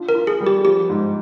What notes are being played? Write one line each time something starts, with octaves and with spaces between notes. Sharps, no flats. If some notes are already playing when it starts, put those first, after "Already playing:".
Already playing: D4 F4
A#4
F4
G#4
G3
G4
F3 G4
G#2